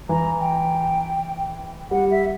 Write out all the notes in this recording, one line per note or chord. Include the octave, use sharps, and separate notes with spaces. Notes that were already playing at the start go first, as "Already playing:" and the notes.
E3 A#5
G5
G3 F#5
E5